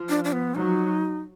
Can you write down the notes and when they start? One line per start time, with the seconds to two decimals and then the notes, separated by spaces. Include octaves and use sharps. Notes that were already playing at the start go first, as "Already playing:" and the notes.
Already playing: F3
0.09 D4
0.24 D4
0.33 B3
0.55 F#3 D#4